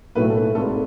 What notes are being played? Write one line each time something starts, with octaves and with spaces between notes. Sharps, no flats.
B1 A2 F#3 A3 E4 B4
A4
B4
G#1 G#2 G#3 A4